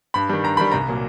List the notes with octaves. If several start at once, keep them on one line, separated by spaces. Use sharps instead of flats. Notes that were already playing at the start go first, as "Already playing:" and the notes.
G2 B5
D#3 G3
G2 A#5
D#3 G3 B5
C2 A#5
A#2 F#3